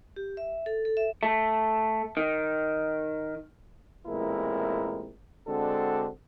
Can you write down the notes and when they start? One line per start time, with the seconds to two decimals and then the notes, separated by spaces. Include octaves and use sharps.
0.16 G4
0.37 E5
0.66 A4
0.85 A4
0.97 E5
1.23 A3
2.17 D#3
4.08 A1 A#2 G#3 C4 E4 A#4
5.48 D3 G#3 C4 D4 F#4 A4